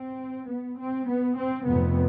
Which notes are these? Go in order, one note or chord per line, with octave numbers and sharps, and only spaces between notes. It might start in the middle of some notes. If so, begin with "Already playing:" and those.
Already playing: C4
B3
C4
B3
C4
F1 F2 C3 B3